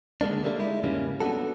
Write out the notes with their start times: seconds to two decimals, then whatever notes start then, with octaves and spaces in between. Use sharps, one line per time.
0.21 D3 G#3 A#3 D4
0.44 G3 A3 A#3 C4 D4
0.59 G#3 D#4 E4
0.83 E2 G#2 C#3 G3 A#3 C#4
1.20 B3 D4 D#4 F#4 A4